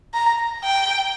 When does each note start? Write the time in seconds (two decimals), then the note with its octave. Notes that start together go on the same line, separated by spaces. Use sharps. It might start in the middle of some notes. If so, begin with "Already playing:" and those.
0.14 A#5
0.64 G5